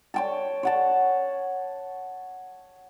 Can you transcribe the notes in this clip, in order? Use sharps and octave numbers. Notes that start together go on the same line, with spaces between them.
C#5 G5 A5
C#5 F#5 A5